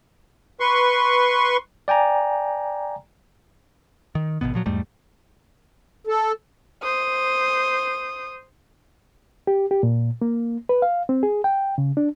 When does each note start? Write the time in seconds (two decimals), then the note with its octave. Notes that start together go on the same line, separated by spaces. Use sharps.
0.60 B4 C6 C#6
1.88 D5 G5 G#5 A#5
4.15 D#3
4.41 G#1 F#2 B2 B3
4.54 A#2 F3 F#3
4.66 E2 G#2 G3 A3
6.07 A4
6.83 C5 D#6
9.47 G4
9.71 G4
9.83 A#2
10.22 A#3
10.69 B4
10.82 F5
11.09 C4
11.23 G#4
11.44 G5
11.78 C#3
11.97 D4